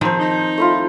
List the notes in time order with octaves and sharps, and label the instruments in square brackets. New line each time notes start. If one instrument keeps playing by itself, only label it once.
[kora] D#3 F3 C4 [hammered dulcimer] C5 A5
[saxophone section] D#4
[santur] A3 E4 F4